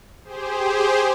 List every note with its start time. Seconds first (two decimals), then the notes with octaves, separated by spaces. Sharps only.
0.24 G4 G#4 C5